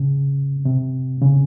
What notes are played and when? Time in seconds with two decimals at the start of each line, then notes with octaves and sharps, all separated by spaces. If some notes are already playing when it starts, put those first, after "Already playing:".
Already playing: C#3
0.65 C3
1.22 C#3